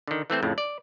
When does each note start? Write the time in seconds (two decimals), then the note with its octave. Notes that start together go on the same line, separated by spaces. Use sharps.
0.08 D3 D#3
0.30 E3 A3 C4 C5
0.43 F2 A2 C#3
0.58 D5